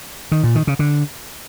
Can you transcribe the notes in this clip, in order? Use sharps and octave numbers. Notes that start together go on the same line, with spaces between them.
D#3
A#2
D#3
C#3
D3